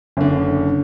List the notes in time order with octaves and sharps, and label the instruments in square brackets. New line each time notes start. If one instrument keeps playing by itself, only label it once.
[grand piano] F#1 D3